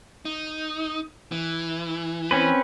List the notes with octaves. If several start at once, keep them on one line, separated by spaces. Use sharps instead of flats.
D#4
E3
C4 C#4 B4